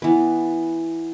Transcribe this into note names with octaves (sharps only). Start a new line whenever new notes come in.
E3 B3